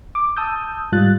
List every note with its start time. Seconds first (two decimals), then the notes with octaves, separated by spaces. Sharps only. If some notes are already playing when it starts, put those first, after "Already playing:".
0.15 D6
0.37 A5 D#6 E6 G6
0.92 G#2 G3 F4 F#6 A6